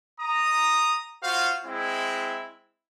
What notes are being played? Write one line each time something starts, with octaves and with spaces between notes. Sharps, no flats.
A#5 D#6
F4 F#4 C5 F5
G#3 C4 E4